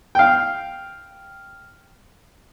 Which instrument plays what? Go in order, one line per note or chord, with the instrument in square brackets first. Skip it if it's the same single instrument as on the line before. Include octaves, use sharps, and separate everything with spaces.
[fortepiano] F5 G5